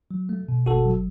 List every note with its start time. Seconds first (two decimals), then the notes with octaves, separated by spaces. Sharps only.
0.11 F#3
0.29 A3
0.49 B2
0.66 G1 F#4 A4
0.85 F#3